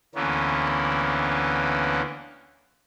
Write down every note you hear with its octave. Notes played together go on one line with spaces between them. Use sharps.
D2 D3 E3 A#3 B3 C#4